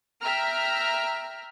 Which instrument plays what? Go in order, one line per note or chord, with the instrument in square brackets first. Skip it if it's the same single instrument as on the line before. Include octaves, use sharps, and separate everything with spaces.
[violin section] E5 G5 A#5 F6